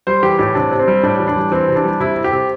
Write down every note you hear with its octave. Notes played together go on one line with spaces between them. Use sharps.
G3 C5
E3 G4
A2 G4
C3 D4
C3
C4
G3
A2 D4
E3
D4
G3
E3 C4
C3
D4
G3
C3 E4
C3
G4
C3